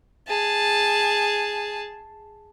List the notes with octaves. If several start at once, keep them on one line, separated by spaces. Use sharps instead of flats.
G#4 A5